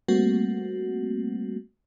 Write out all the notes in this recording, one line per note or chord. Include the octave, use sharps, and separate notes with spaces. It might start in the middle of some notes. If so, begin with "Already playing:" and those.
G3 A3 A#3 C4 F#4